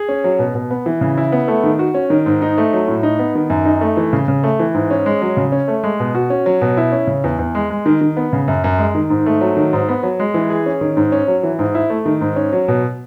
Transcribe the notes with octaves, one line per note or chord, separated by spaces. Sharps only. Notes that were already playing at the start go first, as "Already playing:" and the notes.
Already playing: G#4
C#4
F#3
B2
B2
B3
E3
C#3
E4
B3
A3
D#3
F#4
C#4
D#3
G#2
D#4
A3
F#3
A2
D#4
B3
D#3
F#2
D#4
A3
E3
C#3
C#3
A3
E3
G#2
C#4
G#3
F#3
C#3
C#4
A3
G#3
B2
F#4
C#4
F#3
B2
E4
C#4
C#3
E2
E2
G#3
G#3
D#3
D#3
B3
C#3
F#2
F#2
G#3
D#3
G#2
A3
F#3
D#3
G#2
B3
F#3
G#3
E3
G#4
C#4
D#3
G#2
C#4
F#3
E3
G#2
E4
A3
D#3
G#2
C#4
F#3
B2